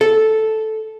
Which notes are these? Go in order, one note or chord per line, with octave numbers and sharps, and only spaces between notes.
A4